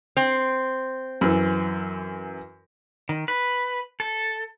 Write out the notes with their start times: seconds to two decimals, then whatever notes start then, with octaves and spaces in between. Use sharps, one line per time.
0.17 C4
1.21 F#2 E3
3.09 D#3
3.28 B4
4.00 A4